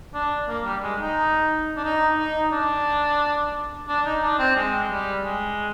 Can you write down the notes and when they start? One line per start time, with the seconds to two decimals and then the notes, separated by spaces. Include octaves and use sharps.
0.14 D4
0.48 A#3
0.65 G3
0.82 G#3
0.99 D#4
1.77 D4
1.84 D#4
2.18 D#4
2.52 D4
3.88 D4
4.05 D#4
4.22 D4
4.39 C4
4.56 G#3
4.90 G3
5.24 G#3